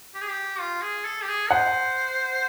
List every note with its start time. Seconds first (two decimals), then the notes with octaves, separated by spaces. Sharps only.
0.14 G4
0.21 G#4
0.29 G4
0.60 F4
0.82 G#4
1.05 A4
1.22 G4
1.28 G#4
1.51 C5 F#5